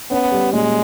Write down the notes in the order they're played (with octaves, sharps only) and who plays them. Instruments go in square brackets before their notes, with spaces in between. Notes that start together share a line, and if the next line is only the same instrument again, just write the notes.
[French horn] B3 [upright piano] C#4
[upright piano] G3
[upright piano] A#2 [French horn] G#3